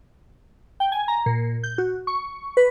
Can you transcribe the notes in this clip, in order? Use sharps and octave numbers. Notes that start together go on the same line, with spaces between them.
G5
G#5
A#5
A#2
G6
F#4
C#6
B4